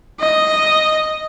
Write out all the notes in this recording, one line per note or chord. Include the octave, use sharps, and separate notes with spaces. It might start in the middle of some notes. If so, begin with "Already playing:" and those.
D#5